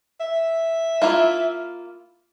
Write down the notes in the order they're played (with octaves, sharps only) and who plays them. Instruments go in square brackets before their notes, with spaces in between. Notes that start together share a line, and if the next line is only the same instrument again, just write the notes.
[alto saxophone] E5
[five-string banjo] A#3 E4 F4